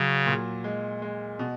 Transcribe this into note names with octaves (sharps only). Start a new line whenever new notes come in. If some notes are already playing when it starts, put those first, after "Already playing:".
Already playing: C#3 F#3
A#2
G#3
G#3
B2